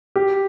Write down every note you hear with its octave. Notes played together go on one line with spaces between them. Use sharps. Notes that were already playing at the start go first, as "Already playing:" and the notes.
G4